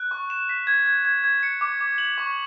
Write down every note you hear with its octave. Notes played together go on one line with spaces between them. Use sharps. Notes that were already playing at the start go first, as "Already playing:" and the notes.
Already playing: F#6
C#6
E7
B6
G#6
G#6
G#6
G#6
C#7
D6
D6
F#7
C#6